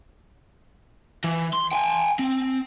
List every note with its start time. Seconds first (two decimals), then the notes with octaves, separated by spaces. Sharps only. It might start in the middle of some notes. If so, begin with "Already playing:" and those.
1.24 E3
1.53 C6
1.71 G5 G#5
2.19 C4